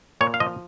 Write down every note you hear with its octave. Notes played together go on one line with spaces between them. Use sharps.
A#2 C#5
F5
F3 D#5